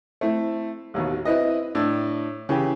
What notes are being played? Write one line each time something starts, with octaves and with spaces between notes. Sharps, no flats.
A3 C4 E4
A1 D#2 B2
C4 E4 B4 D#5
A2 D4
C#3 E3 G4